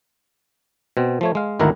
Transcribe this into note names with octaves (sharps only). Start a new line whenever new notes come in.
B2 C4
F3 A3 C#5
G#3 F5
G#1 D2 D#3 E4 A#4 F#5